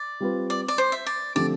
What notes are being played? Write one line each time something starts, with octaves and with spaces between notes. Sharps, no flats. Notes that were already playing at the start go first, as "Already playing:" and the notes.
Already playing: D5
G3 C4 F4 B4
D5
D5
C5
E5
D5
D3 F3 A3 C4 G4 D5